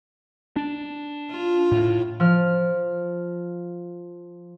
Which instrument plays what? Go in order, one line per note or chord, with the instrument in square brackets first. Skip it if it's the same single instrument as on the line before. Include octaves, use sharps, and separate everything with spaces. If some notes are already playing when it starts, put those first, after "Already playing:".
[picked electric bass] D4
[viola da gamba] F4
[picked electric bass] A2
[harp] F3 F6